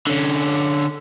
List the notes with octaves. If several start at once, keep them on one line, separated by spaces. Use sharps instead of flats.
D3 C#4